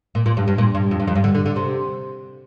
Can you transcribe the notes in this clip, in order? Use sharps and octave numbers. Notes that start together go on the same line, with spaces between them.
A#2
A#2
G2
G2
A#2
G2
F2
G2
F2
G2
D3
D3
D3
C3